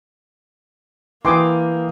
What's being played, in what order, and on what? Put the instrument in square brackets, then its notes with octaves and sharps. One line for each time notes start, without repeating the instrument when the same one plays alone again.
[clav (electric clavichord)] E3 [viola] A#3 [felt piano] G5 D#6 [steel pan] C6 D6